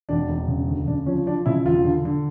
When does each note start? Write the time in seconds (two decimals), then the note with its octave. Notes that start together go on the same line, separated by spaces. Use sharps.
0.09 E1 D4
0.29 E1
0.48 C#3
0.68 D2
0.87 C#3 D4
1.06 F3 C#4
1.26 F3 D4
1.46 C#3 E4
1.65 E1 F4
1.85 D3
2.05 D3